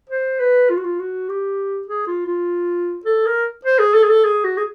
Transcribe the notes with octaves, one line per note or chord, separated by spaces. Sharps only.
C5
B4
F4
F#4
F4
F#4
G4
G#4
F4
F4
A4
A#4
C5
G#4
A4
G#4
A4
G#4
F#4
G#4